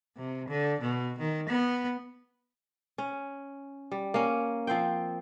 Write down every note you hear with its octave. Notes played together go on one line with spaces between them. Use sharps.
C3
D3
B2
D#3
B3
C#4
G3
A#3 C#4
F3 C4 C5 G5